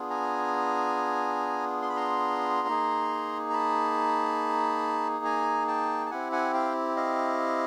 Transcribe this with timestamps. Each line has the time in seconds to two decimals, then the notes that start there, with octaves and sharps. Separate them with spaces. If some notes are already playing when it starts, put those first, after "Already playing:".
Already playing: B3 D4 F4 G#4
0.10 G#5 A#5
1.82 C6
1.90 B5
1.96 A#5 C6
2.68 A#3 D#4 G#4
3.50 A#5
3.53 A5 B5
5.25 G#5 A#5
5.68 G5 A5
6.06 A5
6.11 C4 E4 G4 F#5 G#5
6.32 F#5 G#5
6.54 F5 G5
6.96 D#5 F5